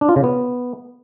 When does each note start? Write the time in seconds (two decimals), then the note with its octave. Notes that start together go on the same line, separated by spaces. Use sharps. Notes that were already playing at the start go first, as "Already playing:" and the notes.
0.01 D4
0.09 F4
0.16 C#3
0.24 B3